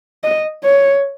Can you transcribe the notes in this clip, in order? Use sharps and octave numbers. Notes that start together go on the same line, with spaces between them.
D#5
C#5